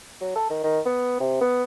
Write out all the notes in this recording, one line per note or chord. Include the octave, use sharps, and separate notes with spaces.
F#3
A4
D#3
D#3
B3
C3
B3